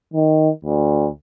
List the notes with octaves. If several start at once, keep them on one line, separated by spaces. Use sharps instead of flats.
D#3
D2